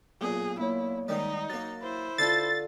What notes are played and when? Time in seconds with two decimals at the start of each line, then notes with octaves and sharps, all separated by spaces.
0.21 B1 A#2 A#3 G#4
0.60 A#3 E4 C#5
1.08 G#2 D#3 G3 D#4
1.50 F#3 A#3 A6
1.83 E4 C5
2.18 D3 D4 F4 E6 A6 C7